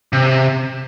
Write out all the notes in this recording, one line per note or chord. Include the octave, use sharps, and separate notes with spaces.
C3